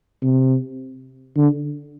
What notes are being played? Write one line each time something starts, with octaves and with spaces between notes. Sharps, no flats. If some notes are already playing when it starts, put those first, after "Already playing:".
C3
D3